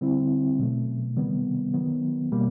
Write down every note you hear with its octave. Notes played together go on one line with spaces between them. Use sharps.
D3 G3 C4 E4
B2 F#3 A3
C3 D#3 G3 B3
D#3 F#3 B3
B2 G3 A#3